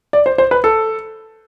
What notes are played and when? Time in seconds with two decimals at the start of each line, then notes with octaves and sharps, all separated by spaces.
0.13 D5
0.26 C5
0.38 C5
0.51 B4
0.64 A4